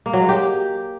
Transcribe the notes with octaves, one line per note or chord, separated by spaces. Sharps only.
A#3
F#3
G#3
G4